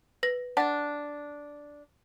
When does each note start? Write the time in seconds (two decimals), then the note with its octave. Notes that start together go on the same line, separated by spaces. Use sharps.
0.23 B4 A#6
0.57 D4 F#5 A6